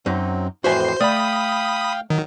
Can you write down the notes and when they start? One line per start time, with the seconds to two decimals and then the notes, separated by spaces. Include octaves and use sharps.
0.06 F#2 F#3 C4 D#4
0.64 F2 A2 E3 F#4 C5 E5 G#5 C7
1.01 A3 D5 F5 G5 B5 D#6
2.10 D#3 F#3